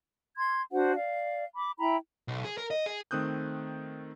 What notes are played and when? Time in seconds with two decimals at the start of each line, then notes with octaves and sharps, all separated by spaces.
0.38 C6 G#6
0.72 D4 F#4 C5 F#5
0.96 D5 F5
1.55 B5 D6
1.79 E4 G5 A#5 B5
2.28 B1
2.45 G#4
2.58 A#4
2.71 D#5
2.86 G#4
3.11 D#3 A3 C4 D#6 F#6 G6